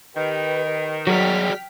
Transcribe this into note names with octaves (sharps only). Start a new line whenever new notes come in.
D#3 G4 B4
F#3 F#4 G#4 D5 G5 F6 B6